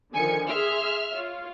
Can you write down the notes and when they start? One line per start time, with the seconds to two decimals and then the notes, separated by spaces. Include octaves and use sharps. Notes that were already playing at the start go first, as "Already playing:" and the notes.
0.13 D3 D#3 F3 G#5 C#7
0.48 G#4 E5 C6 F6
1.14 F4 C#5 F5